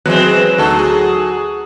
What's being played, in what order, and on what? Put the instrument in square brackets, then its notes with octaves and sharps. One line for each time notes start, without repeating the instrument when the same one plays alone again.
[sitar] E3 G#3 C4 [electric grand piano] F#3 B3 F#6
[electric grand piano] D2 D#4 [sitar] F#3 A4
[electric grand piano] G#4